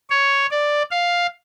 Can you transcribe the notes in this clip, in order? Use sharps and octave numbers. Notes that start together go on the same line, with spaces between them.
C#5
D5
F5